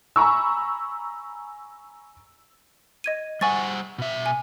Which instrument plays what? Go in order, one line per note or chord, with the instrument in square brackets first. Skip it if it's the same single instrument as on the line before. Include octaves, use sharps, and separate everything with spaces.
[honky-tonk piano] G#5 A#5 B5 C#6 E6
[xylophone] D#5 G#6 D#7
[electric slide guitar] G3 C5 F#5 [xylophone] G#5 C#6 A6
[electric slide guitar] B2 E5
[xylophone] G#5